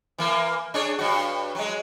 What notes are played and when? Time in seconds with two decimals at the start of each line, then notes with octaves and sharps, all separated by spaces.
0.18 E3 A#3
0.74 D4 G#4 C#5
0.99 G2 F#4
1.55 F#3 G#3